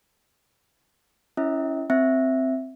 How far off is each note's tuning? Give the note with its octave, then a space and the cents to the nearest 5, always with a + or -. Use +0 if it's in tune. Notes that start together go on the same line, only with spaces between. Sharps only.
C#4 +0 E4 +0 E5 -45
C4 +0 E5 +0